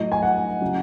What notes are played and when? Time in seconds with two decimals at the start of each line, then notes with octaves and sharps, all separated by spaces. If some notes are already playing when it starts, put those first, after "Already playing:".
Already playing: A2 F#3 D#5
0.12 G#5
0.22 F#5
0.61 C#3 F#3